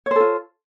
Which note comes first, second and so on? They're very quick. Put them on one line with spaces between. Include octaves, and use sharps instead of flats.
C#5 C5 A4 F4